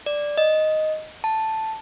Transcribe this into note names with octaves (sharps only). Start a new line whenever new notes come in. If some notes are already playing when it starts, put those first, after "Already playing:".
D5
D#5
A5